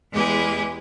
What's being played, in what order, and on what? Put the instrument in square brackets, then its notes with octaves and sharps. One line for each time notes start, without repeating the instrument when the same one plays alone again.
[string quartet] E2 G#3 E4 G4 G#4 B4